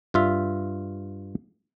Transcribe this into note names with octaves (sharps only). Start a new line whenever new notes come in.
G2 F4 E5